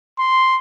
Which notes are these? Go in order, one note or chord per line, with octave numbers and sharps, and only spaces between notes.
C6